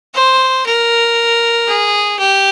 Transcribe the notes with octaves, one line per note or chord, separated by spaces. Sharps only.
C5
A#4
G#4
G4